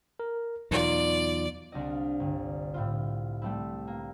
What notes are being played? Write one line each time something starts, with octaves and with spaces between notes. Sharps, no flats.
A#4
E2 B2 F#3 D#4 F4 D5
C2 D4 D#5
F5
G1
A2 E4 F4
G3 A3 C4 E4
A#3